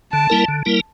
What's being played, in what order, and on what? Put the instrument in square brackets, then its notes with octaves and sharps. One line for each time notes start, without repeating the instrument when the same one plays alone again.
[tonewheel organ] D3 [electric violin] A5
[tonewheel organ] G3 A#3 E4 A#4
D3
G3 A#3 E4 A#4